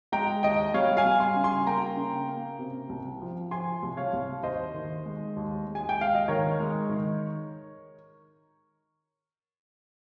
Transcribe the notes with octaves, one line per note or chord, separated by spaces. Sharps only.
G#3 G5 A#5
D#2 D#5 G5
G3 C#5 F5
F5 G#5
G3
G#5 C6
C#3
G#5 C6
A#3 G5 A#5
C#3
A#3
C3
C2
F3
F3 G#5 C6
C2
C#5 F5
C2
D#2 C5 D#5
D#3
G#3
D#2
G#3
G#5
G5
D#2 F5
D#5
D#3 A#4 C#5
G#3
D#3